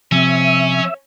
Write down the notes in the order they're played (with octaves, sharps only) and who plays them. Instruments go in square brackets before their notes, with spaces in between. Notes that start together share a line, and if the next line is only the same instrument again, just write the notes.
[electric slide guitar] C3 [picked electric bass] F3 C4 [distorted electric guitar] C#4 [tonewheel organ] E5